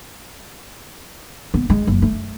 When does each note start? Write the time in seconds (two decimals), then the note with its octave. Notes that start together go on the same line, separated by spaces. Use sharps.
1.54 B3
1.70 G#3
1.87 F#1
2.02 A3